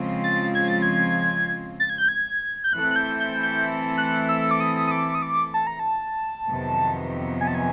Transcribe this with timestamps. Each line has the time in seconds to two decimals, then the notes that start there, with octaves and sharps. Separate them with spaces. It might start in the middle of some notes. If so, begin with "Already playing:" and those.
Already playing: C#3 F3 G#3 C4 F4
0.24 A6
0.55 G#6
0.68 A6
0.82 G#6
1.80 A6
1.90 G#6
1.98 G6
2.08 G#6
2.64 G6
2.73 E3 A3 C4 E4 A4 F#6
2.91 F#6
2.96 G6
3.20 G6
3.43 G6
3.97 F#6
4.29 E6
4.51 D6
4.60 D#6
4.87 D#6
4.91 D6
5.15 D#6
5.22 D6
5.54 A5
5.67 A#5
5.79 A5
6.47 F2 C3 D#3 F#3 B3
7.41 G#5
7.48 A5
7.55 G#5